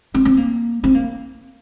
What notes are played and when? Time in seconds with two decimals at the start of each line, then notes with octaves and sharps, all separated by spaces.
0.14 C4
0.25 C4
0.37 A#3
0.84 C4
0.95 A#3